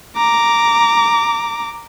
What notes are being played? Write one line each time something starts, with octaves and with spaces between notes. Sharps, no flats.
A#5 D6